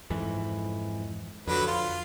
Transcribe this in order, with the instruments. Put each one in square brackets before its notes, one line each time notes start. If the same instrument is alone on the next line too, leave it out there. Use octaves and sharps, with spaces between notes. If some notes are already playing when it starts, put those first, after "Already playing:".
[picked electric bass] F2 G#2 E3
[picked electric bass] F2 [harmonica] D3 F#3 B4
[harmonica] F4